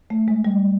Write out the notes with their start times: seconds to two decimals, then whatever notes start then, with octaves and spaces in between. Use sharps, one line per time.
0.10 A3
0.28 G#3
0.45 G3